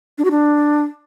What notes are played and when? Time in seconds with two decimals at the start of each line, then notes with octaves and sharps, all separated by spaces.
0.18 D4
0.25 F#4
0.31 D4